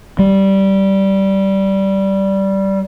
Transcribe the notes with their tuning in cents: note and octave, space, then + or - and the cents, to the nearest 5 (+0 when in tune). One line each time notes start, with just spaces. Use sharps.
G3 -10